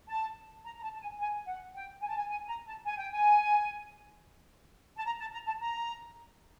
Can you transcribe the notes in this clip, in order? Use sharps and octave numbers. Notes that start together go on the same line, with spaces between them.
A5
A#5
A#5
A5
A5
G#5
G#5
F#5
G5
G#5
A5
G#5
G#5
A#5
A5
G#5
G5
G#5
A5
A#5
A5
A#5
A5
A#5